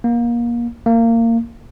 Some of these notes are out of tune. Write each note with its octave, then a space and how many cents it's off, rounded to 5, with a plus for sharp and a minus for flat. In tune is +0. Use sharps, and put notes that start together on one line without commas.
A#3 +25
A#3 -25